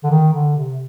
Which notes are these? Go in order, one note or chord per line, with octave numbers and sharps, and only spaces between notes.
D3
D#3
D3
C3